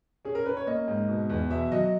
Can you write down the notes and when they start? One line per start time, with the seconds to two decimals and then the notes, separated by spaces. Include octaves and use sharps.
0.25 C#4 G#4
0.35 A#4
0.46 C#4 B4
0.57 C#5
0.67 A#3 D#5
0.88 G#2
1.09 B2
1.30 E2
1.50 B2 E5
1.72 F#3 D#5